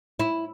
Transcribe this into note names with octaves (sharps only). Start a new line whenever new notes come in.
E4